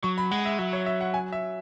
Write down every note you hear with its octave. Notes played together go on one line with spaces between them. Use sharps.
F#3 C#6
B5
G#3 F#5
E5
F#3 E5
C#5
E5
F#5
G#5
E5